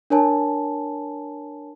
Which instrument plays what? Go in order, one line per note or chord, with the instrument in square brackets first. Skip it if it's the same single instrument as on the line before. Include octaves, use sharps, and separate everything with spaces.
[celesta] D4 A#4 C#5 G#5 A5